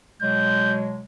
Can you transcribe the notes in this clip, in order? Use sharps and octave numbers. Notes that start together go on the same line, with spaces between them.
B2 F#3 G#3 G6